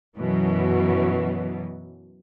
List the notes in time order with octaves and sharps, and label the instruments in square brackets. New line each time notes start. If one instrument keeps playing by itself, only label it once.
[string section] F#2 B2 E3 F#3